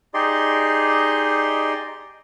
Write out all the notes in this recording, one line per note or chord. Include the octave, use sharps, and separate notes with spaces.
D#4 G4 G#4 D5 D#5 C6